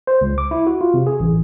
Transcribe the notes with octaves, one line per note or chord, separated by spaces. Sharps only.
C5
C#2
D6
E4
F#4
F4
C3
G#4
A1